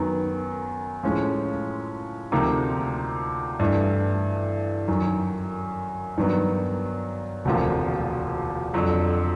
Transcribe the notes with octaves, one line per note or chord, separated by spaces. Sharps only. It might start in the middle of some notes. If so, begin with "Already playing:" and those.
Already playing: F#2 D#3 F#3 B3
A2 F3 G#3 C#4
D2 C3 F3 A#3 D#4
G2 E3 A3
F#2 D#3 F#3
G2 D#3 F#3 B3
E1 D2 C3 F3 A#3
F2 D3 F#3